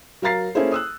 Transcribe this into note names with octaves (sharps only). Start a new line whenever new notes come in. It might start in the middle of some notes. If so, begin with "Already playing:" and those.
F#3 A#4 F5 A#5 A6 C7
A#3 C#4 E4 G#4 A4 C5
D#6 E6 F#6